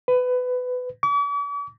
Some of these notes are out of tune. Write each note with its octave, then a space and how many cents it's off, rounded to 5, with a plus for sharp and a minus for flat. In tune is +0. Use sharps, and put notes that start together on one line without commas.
B4 +20
D6 -45